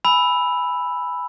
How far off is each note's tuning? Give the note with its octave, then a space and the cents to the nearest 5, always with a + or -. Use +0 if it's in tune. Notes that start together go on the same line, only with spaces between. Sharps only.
G#5 +0 B5 +0 E6 +0